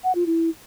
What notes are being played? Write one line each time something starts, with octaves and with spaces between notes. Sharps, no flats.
F#5
F4
E4